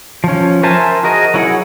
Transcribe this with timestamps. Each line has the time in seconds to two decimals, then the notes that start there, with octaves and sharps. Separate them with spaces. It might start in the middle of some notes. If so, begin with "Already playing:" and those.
0.24 F3 C#4
0.63 A#4 C5 E5 G#5 A5
1.03 F#4 G#4 A#4 D#5
1.34 F#3 E4 G#4 F#5